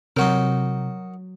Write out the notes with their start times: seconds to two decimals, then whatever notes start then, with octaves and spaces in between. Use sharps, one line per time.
0.17 C3 F#3 D#4 F#4 A#4 C#5